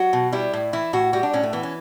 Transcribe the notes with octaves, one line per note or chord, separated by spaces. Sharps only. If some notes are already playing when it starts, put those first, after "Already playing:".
Already playing: F#3 F#4
B2
G3 E4
A2
E3 E4
A2 F#4
G3 F#4
D4
A2 C#4
A3
E3 B3
C#4